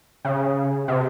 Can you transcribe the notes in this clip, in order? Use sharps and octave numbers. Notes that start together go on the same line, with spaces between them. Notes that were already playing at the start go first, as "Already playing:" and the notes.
C#3
C3